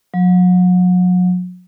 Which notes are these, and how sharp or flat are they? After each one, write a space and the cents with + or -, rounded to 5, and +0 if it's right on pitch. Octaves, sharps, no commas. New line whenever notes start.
F#3 -40